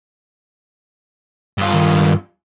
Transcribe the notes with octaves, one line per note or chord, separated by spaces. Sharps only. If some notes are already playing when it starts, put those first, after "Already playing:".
G2 F4
D#3